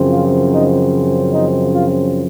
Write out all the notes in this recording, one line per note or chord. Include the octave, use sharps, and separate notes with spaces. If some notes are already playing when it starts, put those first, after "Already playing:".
Already playing: F#2 C#3 F3 C4
F4
D#4
D#4
F4